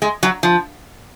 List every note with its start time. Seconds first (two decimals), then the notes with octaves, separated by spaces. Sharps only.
0.02 G#3
0.23 F#3
0.43 F3